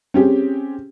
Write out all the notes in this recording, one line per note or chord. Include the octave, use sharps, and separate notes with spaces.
C4 C#4 G4 G#4